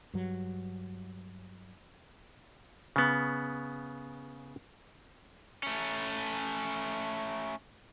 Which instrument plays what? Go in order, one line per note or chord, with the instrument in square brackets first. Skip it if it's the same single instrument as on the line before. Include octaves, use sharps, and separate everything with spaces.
[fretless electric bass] G2 F#3
[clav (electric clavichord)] C#3 B3
[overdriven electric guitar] A3 C#4